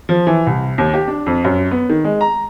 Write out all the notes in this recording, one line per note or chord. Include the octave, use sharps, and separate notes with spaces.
F3
E3
C2
D#2
G4
D4
F2
F#2
B3
D#3
G#3
A#5